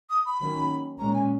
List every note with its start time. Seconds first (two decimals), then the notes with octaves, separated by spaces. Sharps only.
0.10 D#6
0.25 B5
0.40 D#3 F#3 A#3 C#4
0.99 A#2 G#3 C#4 A#5
1.13 G#5